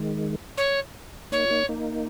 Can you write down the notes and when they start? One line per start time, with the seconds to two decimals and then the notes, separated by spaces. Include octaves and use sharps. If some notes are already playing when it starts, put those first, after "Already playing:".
Already playing: D#3 G#3
0.57 C#5
1.32 A#3 D#4 C#5
1.45 F4
1.50 A#3 D#4
1.69 A#3 D#4